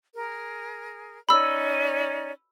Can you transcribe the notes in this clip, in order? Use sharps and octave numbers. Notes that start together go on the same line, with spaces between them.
G#4 A#4
C#4 D#4 D5 B5 E6